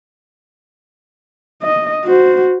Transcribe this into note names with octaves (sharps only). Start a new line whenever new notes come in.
D#5
F#4 C5